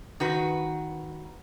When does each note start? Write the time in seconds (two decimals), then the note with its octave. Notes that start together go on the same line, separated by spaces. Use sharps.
0.20 D#3 F#4 B4